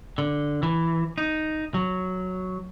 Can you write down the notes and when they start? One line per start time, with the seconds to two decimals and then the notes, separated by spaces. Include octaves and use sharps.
0.18 D3
0.63 E3
1.18 D#4
1.74 F#3